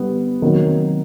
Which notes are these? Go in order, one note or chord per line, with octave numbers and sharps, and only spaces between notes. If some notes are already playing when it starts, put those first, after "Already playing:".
Already playing: D3 G3 B3
C3 D#3 F#3 A#3